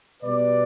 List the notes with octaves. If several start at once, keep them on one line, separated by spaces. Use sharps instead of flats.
B2 G3 B3 B4 D5